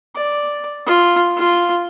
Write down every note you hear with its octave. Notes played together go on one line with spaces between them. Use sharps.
D5
F4
F4